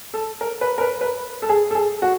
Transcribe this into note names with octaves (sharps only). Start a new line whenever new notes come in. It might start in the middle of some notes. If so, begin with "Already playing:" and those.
A4
A#4
B4
A#4
B4
B4
A4
G#4
A4
G#4
F#4